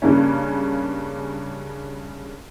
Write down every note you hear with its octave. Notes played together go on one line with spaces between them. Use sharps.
G2 C#3 A#3 C#4